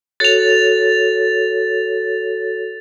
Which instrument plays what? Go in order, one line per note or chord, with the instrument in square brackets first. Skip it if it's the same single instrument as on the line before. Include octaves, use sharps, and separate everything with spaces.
[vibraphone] F#4 A4 C#5 [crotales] A6 F7